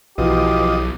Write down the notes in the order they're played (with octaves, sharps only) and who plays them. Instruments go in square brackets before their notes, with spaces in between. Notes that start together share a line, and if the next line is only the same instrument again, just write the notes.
[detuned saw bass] B1 [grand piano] E3 F#4 [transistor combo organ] F3 D#5 [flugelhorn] G4